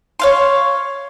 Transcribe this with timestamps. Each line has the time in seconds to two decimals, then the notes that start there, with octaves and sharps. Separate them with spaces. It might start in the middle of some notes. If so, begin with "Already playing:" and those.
0.19 C#5 F5 C6